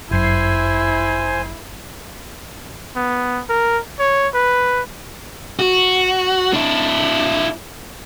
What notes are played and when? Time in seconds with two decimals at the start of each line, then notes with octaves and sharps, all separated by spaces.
0.11 G1 F#2 E4 C5 G#5 C7
2.96 B3
3.49 A#4
3.99 C#5
4.34 B4
5.59 F#4
6.53 D4 E4